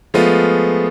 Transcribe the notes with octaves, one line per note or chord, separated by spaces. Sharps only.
F3 G#3 A3 B3 F4